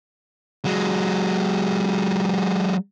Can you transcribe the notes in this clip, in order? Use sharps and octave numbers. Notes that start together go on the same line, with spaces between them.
F#3 G#3